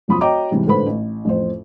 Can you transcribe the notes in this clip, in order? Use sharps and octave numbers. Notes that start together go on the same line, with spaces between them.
E1 F#2 F3 B5 C6 D#6
F#4 C#5 D#5 G5 A#5 D6
G#2 C3 E3 G3
G#1 A2 D3 B4 C5 B5
A1
A1 F2 C5